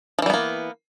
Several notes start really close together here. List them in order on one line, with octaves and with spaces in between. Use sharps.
F3 E3 G3 B3 A#3